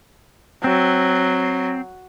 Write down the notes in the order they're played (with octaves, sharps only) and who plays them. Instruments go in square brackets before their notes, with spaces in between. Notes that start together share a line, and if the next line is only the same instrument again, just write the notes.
[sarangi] F#3 [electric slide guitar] C4